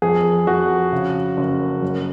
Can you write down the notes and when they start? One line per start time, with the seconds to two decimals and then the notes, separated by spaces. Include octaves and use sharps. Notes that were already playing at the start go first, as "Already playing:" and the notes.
0.02 F2 G#4
0.47 F2 F#4
0.92 C#3
1.37 F#1
1.82 F#2